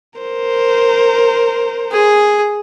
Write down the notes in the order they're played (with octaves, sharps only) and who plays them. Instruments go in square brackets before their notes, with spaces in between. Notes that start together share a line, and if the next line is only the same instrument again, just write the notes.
[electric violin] A#4 C5
[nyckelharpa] G#4